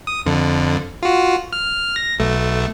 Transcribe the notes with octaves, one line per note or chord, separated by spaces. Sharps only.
D#6
F2 D3
F4 F#4
F6
A#6
B1 A3